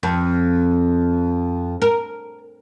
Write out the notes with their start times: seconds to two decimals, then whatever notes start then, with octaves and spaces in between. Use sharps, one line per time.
0.03 F2
1.82 A#4